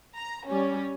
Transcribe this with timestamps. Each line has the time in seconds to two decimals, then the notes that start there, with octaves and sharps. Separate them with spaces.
0.15 A#5
0.47 G3 C#4